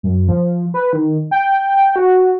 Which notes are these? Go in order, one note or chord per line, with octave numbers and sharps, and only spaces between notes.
F#2
F3
B4
D#3
G5
F#4